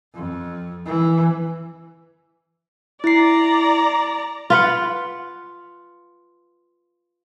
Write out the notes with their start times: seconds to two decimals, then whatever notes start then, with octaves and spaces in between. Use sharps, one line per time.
0.14 F2
0.86 E3
3.04 E4 D5 A#5 C7
4.50 F4 B4 F#5